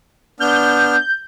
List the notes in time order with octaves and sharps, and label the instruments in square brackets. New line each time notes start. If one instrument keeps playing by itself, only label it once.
[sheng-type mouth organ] B3 D4 F6 [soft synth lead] G6